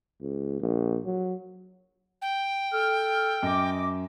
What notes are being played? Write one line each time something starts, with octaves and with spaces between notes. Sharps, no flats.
C#2
A#1
F#3
G5
A4 F6
F#2 D#5 D6